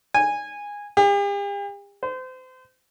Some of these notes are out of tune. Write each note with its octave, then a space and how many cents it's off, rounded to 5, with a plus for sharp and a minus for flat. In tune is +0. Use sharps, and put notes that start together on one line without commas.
G#5 -15
G4 +45
C5 -30